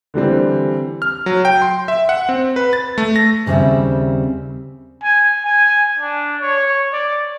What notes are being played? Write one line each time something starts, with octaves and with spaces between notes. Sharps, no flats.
D3 E3 G3 C4
F6
F#3
G5
C6
E5
F#5
C4
B4
A6
A3
A#6
D#2 C#3 G3 C4 E5
G#5
G#5
D4
C#5
D5